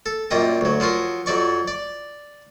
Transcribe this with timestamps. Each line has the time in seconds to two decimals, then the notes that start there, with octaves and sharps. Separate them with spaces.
0.06 A4
0.31 F#2 A#2 G3 D#5 G5
0.61 D2 F#3
0.80 F3 F#3 F4 A#4
1.26 F2 F#3 D5 C#6
1.68 D5